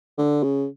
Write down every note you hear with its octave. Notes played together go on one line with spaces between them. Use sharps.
D3
C#3